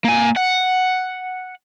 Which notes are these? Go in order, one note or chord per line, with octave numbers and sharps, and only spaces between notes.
A#3 G#5
F#5